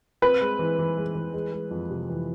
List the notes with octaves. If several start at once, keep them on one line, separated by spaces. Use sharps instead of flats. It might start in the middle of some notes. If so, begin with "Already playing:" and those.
C4 B4
G#3
E3
E3
G#3
E3
G#3
G#3
F2
C3
E3